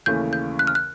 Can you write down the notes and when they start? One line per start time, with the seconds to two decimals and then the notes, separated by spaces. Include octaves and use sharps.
0.06 D#2 C#3 E3 A3 C#4 G6
0.33 G6
0.59 F#6
0.67 F6
0.75 F#6